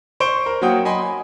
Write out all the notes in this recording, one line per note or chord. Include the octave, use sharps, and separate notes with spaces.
C5 C#6 D7 G7
A#4
F#3 A#3 F#4 F#5 G5 D#6
D#5 G#5 B5 C6